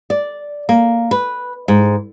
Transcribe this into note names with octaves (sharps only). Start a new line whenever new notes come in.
D5
A#3
B4
G#2